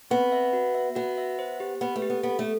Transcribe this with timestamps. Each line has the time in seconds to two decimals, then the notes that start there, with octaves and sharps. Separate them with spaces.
0.11 B3 C4
0.32 E5
0.53 F#4
0.74 E5
0.96 B3 F#4
1.18 E5
1.39 C5
1.60 G4
1.81 B3 B4
1.96 A3
2.02 G4
2.10 B3
2.23 B3 A4
2.39 A3